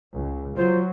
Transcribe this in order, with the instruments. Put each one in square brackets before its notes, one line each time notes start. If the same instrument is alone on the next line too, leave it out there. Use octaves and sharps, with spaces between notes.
[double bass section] C#2
[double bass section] F#3 [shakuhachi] F4 [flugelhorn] C5